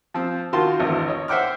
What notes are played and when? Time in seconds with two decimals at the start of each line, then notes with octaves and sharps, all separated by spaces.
0.14 F3 C4
0.53 D#3 F4 F#4 A5 C6
0.80 G#1 E2 D3 D#5
1.08 C#5 D#5
1.28 C5 E5 F#5 G5 D6 F6